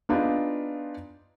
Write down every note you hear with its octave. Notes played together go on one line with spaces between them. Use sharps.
B3 D4 D#4 F4 G#4